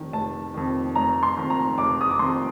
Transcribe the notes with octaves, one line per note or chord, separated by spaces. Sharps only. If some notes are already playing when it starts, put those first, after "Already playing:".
Already playing: F1 F2 D#3
F1 A5
F2 D#3
F1 A#5
C6
F2 D#3
A#5
F1 D6
D#6
D6
F2 D#3 C6